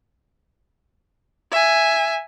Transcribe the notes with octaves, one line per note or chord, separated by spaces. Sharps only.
E5 G#5